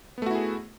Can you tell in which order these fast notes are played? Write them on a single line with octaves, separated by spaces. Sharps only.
B3 A3 F#4 E4 G#4